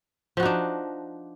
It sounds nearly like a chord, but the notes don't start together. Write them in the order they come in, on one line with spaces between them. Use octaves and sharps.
F3 F#4 D#4 D4